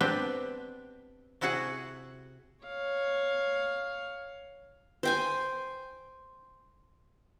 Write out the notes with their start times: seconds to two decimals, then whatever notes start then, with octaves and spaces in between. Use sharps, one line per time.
0.01 B3 C4 D4 G4 B4 G5
1.41 C3 E4 F#4 G#4 F#5
2.65 C#5 F5
5.03 C5 G5 G#5